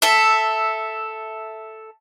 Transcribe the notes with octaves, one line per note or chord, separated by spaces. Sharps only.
A4 E5